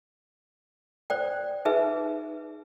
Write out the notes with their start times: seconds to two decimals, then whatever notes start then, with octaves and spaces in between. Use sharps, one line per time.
1.10 C5 D5 G5
1.65 D#4 G#4 B4 E5